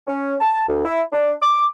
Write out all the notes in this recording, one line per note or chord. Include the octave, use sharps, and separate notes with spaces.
C#4
A5
D2
E4
D4
D6